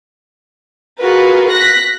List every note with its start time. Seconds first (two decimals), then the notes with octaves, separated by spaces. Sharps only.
1.00 F4 F#4 G#4 A#4 B4
1.52 F#6 A#6 B6